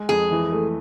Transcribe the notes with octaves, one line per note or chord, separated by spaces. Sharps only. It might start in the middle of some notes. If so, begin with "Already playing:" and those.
Already playing: G#3
F2 G#4
E3
A3